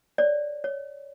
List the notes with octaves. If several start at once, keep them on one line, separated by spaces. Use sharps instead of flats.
C#5 D5
C#5